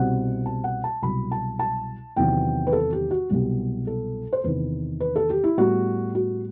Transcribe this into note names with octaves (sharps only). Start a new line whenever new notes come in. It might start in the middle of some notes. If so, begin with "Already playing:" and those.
Already playing: C2 B2 G3 C4 F#5
A5
F#5
A5
C2 B2 F#3 B5
A5
A5
E2 C3 D#3 F#3 B3 G5
B4
A4
G4
F#4
C2 B2 F#3 B3 G4
A4
C5
E2 C3 D#3 B4
B4
A4
G4
E4
A2 G3 B3 F#4
F#4